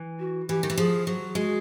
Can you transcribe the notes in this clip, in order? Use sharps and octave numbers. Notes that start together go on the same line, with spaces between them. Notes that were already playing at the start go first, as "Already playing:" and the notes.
Already playing: E3
F#4
E3 G4
D#3
E3
F3 G#4
F#3
G#3 F#4